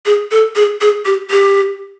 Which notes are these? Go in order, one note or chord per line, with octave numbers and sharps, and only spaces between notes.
G#4
A4
G#4
G#4
G4
G4